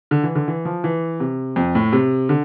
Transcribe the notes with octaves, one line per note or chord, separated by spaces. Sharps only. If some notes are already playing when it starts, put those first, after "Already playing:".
D3
E3
D3
E3
F3
E3
C3
F2
A2
C3
D3